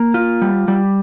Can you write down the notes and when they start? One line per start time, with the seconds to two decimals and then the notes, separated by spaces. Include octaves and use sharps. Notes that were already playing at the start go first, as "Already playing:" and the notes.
Already playing: A#3
0.14 F4
0.42 G3
0.68 G3